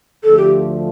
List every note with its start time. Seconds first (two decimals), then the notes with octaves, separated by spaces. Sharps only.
0.23 D2 D3 F3 A3 A4
0.37 G4